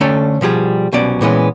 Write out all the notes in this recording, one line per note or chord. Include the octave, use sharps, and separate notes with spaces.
D3 A3 C#4 D4 A4 C#5
B2 F3 G3 G#4
C2 B2 F#3 C#4 D5
A#2 E3 G#3 B3 C#4